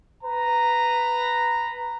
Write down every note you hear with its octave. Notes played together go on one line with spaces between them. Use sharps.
B4 A#5